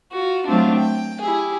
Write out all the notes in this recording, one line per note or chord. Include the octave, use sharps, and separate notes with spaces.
F4 F#4
F#3 A3 C4 D4 F4
G5
E4 G4 G#4